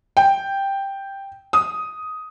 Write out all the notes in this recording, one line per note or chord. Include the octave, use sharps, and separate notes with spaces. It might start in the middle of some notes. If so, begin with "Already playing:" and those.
G5
D#6